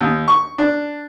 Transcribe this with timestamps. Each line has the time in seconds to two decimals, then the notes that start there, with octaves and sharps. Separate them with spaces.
0.01 D#2
0.28 C#6
0.58 D4